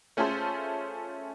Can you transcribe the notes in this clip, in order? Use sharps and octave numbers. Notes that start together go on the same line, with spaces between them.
A3 C#4 F4 G#4 A4 C5